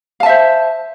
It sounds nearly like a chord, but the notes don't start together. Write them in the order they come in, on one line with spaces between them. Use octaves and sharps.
F5 A5 E5 C5